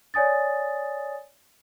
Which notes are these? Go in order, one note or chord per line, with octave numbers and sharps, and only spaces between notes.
C#5 D5 G#5 D#6 A6